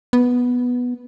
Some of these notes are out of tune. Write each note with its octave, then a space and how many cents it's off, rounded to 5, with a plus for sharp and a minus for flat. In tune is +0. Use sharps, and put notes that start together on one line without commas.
B3 -5